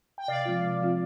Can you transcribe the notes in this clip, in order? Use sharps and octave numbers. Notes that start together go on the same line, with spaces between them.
G5
C3 D5 F5
F3 G#3 C4 F4
C3
F3 G#3 C4 F4